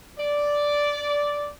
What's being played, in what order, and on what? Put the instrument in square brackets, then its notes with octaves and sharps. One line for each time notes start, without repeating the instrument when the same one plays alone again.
[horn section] D5